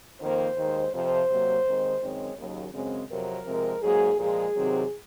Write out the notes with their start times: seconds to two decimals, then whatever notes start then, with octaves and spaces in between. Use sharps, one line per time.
0.21 F2 D#3 A#3 C5
0.57 D#2 D#3 G#3
0.93 F2 C3 F3 C5
1.29 C3 F#3 A#3
1.65 D#2 D#3 G#3 C4
2.01 F#2 D#3 G#3 C4 C#5
2.38 D#2 C#3 F#3
2.74 F#2 C#3 G#3 C4
3.10 F2 C3 F#3 C4 A#4
3.46 C3 F3 G#3 C4
3.82 G#2 F#3 A#3 G#4
4.18 A#2 F3 G#3 G#4
4.54 C3 D#3 F#3 C4